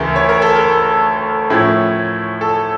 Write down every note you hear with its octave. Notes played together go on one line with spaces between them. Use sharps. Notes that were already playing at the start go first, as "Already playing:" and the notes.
Already playing: D2 C#3 E3 A3 E4 A#4
C#5
A#4
A4
A#4
A2 F3 C#4 E4
A4